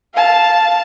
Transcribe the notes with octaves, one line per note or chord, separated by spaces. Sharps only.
F5 A5